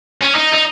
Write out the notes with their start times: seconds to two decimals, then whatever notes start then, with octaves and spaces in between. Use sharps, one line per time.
0.21 C#4
0.35 D#4
0.53 D#4